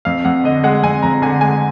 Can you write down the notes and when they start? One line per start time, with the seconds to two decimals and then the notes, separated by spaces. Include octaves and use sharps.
0.05 F2 F5
0.25 F2 F#5
0.44 D3 D#5
0.64 G#3 F#5
0.83 F2 G#5
1.02 F2 A#5
1.22 D3 G#5
1.41 G#3 G#5